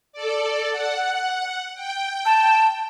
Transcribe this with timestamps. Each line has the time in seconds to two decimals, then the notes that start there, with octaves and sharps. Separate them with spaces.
0.12 A4 D5
0.72 F#5
1.75 G5
2.26 A5